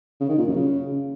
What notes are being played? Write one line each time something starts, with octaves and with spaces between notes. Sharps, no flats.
C#3
D#3
A#2
F#2
C#3